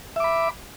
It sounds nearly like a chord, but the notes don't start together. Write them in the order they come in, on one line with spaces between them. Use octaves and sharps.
E5 D6 B5